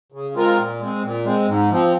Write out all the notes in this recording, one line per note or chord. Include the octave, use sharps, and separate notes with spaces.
C#3
G#3 C4 F4 A#4
A#2
G#3 C4
A#2
G#3 C4
G#2
F3 C4